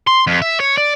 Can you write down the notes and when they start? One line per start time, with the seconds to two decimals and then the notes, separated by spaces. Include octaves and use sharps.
0.07 C6
0.27 F2
0.42 E5
0.60 C#5
0.78 D5